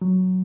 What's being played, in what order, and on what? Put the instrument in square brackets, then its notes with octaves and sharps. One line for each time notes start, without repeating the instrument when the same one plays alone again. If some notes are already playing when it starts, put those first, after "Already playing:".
[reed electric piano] F#3